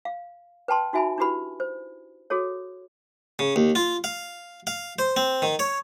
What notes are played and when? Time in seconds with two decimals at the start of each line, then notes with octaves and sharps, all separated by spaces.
0.05 F5
0.68 B4 G5 A5 C6
0.93 D#4 F#4 E5 G#5 A5 B5
1.18 D4 E4 F#4 G4 B4 B5
1.60 C5
2.30 F#4 G#4 A4 C#5
3.39 C#3
3.56 D#2
3.75 F4
4.04 F5
4.67 F5
4.99 C5
5.17 C4
5.42 D#3
5.59 C#5